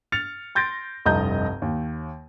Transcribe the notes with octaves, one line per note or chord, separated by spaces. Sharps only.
F6 A6 C#7 F7
C6 G6 A6 A#6 D7
F1 C2 G2 D#5 A#5 G6
D#2